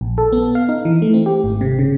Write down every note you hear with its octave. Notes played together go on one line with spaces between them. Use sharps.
A#1
A4
B3
F5
D#4
E3
A3
C4
G4
G#1
C3
C#3